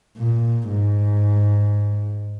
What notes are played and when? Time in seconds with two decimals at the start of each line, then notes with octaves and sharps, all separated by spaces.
0.18 A#2
0.69 G#2